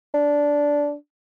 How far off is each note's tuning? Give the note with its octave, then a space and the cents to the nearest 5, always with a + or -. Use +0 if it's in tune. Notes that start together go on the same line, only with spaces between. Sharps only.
D4 -10